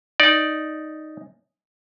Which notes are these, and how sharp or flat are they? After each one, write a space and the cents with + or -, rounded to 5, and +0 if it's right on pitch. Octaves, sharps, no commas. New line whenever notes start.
D#4 +0 D5 +0